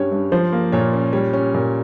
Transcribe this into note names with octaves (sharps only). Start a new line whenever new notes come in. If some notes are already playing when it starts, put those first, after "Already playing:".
Already playing: G2 G3 C#4 C#5
G2
F3 C5
A#3
A#2 C#5
C#4
G3 C#5
C#4
A#2